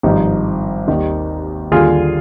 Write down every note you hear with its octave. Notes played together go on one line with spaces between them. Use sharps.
G#1 G2 F3 D#4 G4
D#2 D#3 G3
D#2 D3 G3 F4 G#4